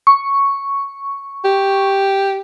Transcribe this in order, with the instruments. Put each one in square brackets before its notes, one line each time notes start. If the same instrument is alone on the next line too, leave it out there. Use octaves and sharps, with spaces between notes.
[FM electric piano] C#6
[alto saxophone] G4